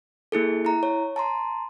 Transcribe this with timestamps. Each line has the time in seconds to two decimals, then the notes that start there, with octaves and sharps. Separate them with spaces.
0.32 A#3 E4 G#4 A4
0.65 E4 A#5
0.83 C#5
1.16 A5 A#5 C6